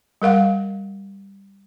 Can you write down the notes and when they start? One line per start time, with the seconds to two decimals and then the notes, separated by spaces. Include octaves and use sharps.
0.22 G3 A#4 F5 F#5